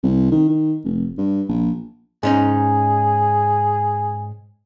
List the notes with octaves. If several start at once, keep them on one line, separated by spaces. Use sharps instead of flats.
C2
D#3
D#3
F1
G2
A#1
G#2 C#4 D#4 G#4